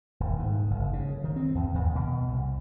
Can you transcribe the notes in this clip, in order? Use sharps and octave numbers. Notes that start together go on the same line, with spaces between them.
D#1
G#2
F#1
C#3
D#3
C4
E2
D#2
B2
C2